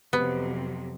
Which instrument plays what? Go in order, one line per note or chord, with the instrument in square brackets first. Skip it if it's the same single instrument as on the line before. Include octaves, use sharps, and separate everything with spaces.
[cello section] F2 C3 F#3 [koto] B3